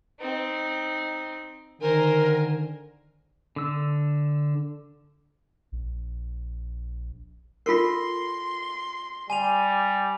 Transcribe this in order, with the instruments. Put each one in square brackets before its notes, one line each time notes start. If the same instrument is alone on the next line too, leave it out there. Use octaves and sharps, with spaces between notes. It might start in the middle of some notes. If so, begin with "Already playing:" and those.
[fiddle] C4 D#4
[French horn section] D3 D#3 [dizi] A#4 [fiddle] C5 G#5
[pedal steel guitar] D3 E6
[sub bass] A#1
[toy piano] F4 A4 A#4 [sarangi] C6 [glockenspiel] A#6 C7
[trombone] G3 [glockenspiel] G#5 D#7 F7